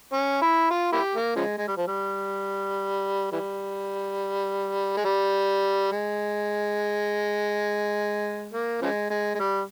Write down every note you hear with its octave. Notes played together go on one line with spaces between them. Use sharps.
C#4
E4
F4
A#3 E4 G4
A#3
C#3 F3 G#3
G#3
G3
F3
G3
E3 G3
G#3
G3
G#3
A#3
C#3 F3 G#3
G#3
G#3
G3